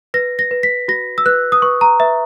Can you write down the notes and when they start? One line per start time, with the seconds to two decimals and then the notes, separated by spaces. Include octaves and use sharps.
0.14 B4 A#6
0.39 A#6
0.51 B4
0.63 B6
0.88 F#4 A#6
1.18 E6
1.26 B4 F#6
1.52 D#6
1.62 B4 C#6
1.81 A#5
2.00 B4 E5